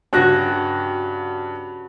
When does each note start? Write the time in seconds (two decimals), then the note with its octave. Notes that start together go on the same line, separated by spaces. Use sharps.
0.13 G2 C#3 F#4 G4 F#6 A#6